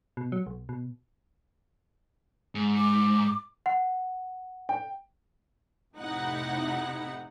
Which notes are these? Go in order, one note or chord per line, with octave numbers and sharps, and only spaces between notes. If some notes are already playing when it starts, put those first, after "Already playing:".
B2
F#3
B1
B2
G#2
D6
F#5
G5
F2 A2 C3 D#4 E4 F#5